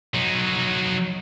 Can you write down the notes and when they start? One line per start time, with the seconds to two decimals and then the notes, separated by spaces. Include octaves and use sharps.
0.15 F#3 D#4